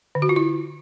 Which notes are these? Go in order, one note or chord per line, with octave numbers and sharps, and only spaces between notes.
D3
F#4
F4
E4